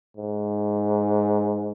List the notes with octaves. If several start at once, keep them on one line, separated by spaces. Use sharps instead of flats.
G#2